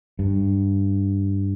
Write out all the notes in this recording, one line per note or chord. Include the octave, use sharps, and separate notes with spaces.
G2